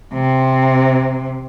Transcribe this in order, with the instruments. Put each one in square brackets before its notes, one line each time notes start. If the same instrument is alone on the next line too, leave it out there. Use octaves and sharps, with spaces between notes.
[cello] C3